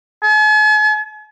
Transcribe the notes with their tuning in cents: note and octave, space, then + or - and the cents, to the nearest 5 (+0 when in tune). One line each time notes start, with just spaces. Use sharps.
G#5 +45